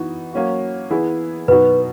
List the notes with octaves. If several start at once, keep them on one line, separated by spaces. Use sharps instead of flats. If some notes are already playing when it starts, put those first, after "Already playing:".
Already playing: E3 B3 D#4 F#4
F#3 A#3 C#4 F#4
E3 B3 E4 G#4
B2 F#3 B3 D#4 F#4 B4